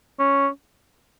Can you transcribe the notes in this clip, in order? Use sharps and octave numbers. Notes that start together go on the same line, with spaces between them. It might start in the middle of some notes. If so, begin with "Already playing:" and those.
C#4